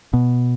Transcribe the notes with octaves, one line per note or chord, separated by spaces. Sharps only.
B2